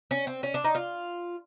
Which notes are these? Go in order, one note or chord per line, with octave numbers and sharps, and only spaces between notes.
C#4
C4
C#4
D4
D#4
F4